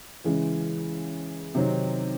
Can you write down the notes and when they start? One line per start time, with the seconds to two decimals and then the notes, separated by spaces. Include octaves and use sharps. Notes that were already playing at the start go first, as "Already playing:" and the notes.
0.24 C#3 E3 G#3
1.55 C3 D#3 F#3 C4 D#4